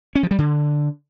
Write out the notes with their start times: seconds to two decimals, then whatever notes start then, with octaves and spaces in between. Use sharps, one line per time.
0.15 C#4
0.23 F3
0.31 G3
0.38 D3